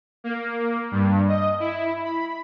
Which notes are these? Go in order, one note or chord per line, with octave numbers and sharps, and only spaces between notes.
A#3
G2
D#5
E4
B5